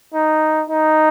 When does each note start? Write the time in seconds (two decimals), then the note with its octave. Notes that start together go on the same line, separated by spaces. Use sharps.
0.14 D#4
0.69 D#4